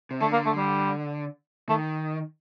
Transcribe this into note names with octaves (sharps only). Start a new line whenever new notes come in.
C3
D3 A3
A#3
A3
G3
D#3 A3